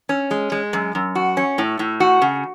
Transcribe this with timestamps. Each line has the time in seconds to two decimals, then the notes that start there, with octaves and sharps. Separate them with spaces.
0.09 C#4
0.31 G#3
0.52 G#3
0.73 F#2
0.95 F#2
1.15 F#4
1.37 C#4
1.58 A2
1.79 A2
2.00 F#4
2.22 C#3